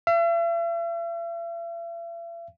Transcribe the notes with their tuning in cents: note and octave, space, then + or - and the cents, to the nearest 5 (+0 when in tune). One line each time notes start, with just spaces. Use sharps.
E5 +45